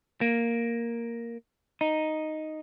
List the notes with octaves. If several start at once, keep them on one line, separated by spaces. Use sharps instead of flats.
A#3
D#4